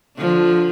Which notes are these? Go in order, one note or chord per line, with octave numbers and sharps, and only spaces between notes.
D3 F3